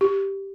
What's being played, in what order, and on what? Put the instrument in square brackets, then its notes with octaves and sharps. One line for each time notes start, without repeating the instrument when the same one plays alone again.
[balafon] G4